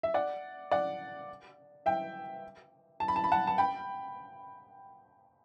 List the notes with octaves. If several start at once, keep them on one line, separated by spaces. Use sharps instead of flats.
E5
D5 F#5
D5 F#5
E5 G5
A5
B5
A5
B5
F#5 A5
A5
G5 B5